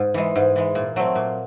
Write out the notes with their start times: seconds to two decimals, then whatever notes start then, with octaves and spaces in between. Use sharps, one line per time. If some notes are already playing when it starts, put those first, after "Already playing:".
Already playing: G#2
0.14 E3 G#3
0.36 G#2
0.56 E3 G#3
0.75 A#2
0.96 F#3 A3 C4
1.15 A#2